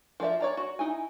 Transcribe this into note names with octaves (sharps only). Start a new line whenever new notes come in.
F3 A#4 D5 E5
C#5 D5 A#5
F#4
D#4 E4 G#5